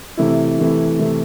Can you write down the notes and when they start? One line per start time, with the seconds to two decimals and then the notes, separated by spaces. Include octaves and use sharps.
0.17 C3 E3 A3 E4
0.59 C3 E3 A3 E4
0.99 C3 E3 A3 E4